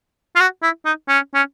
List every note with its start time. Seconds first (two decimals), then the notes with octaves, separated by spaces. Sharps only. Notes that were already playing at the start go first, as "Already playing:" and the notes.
0.36 F4
0.40 F#4
0.63 E4
0.86 D#4
1.08 C#4
1.34 C#4